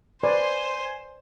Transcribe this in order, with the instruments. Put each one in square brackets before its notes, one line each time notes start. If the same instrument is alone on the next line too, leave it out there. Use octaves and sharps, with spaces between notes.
[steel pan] B4 D5 [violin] C5 [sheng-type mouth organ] G#5 [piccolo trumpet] C6